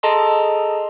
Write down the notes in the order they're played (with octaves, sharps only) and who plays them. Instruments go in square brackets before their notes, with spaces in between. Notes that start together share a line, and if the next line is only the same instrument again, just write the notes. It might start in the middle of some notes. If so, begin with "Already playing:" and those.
[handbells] G#4 A4 D#5 A5 A#5 C6